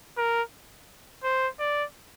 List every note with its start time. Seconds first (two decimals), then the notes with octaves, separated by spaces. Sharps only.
0.17 A#4
1.24 C5
1.59 D5